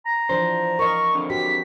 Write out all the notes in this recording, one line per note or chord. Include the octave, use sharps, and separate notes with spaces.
A#5
E3 F3 D4 C5
A#4 D#5 C#6
F2 D3
F#4 G4 B6